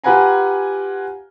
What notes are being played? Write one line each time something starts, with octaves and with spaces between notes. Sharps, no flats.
F4 G4 B4 F#5 G#5 A#5